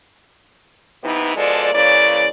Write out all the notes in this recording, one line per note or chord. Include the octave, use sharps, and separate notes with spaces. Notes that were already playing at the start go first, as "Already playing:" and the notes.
C3 E3 B3 D#4
B2 F3 G#3 A4 D5
C#3 E3 A#3 C#5 D5